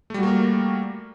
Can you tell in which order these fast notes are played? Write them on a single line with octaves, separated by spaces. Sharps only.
A3 G3 F#4 A#3 A#4